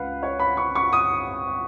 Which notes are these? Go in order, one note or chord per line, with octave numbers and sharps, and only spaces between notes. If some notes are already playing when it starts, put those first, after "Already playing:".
Already playing: C#2 B4 F5 F#5
C#5
B5
C#6
C#6
D#6